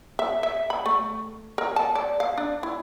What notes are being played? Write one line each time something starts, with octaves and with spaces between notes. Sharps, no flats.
E5
E5
B5
A3
A#4
A5
D5
F5
D4
E4